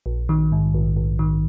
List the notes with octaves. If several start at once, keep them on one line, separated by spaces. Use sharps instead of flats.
A#1
D#3
G#2
A#1
A#1
D#3